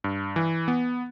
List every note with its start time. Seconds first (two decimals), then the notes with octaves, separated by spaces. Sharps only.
0.04 G2
0.36 E3
0.68 B3